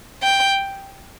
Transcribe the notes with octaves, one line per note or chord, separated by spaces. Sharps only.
G5